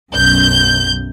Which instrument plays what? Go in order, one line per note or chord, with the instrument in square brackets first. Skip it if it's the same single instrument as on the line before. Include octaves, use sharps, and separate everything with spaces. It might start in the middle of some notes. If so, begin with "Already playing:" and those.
[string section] B1 F#2 G6